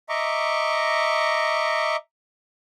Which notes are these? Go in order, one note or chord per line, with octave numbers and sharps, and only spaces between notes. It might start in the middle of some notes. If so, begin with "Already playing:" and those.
D#5 E5 A#5 C#6 D6